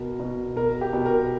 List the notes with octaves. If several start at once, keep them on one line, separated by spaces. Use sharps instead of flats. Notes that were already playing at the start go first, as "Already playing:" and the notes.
Already playing: B2 A#4
B2
B2 A#4
G4
B2
A#4